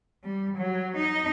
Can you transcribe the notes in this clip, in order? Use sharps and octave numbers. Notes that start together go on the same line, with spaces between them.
G3
F#3
D#4